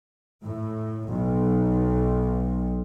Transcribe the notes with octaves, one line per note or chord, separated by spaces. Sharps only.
A2
B1